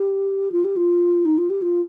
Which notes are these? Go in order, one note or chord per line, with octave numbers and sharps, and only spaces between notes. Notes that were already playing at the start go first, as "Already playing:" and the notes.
Already playing: G4
F4
G4
F4
D#4
F4
G4
F4